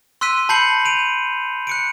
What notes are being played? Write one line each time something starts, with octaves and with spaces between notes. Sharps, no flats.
C6 E6 F#6 B6 D#7
A5 B5 G6 C7 C#7 F#7
D7 D#7 F7
F#6 C#7 D7